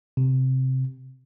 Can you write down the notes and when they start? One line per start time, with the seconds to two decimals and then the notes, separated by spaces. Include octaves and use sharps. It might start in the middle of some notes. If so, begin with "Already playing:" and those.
0.17 C3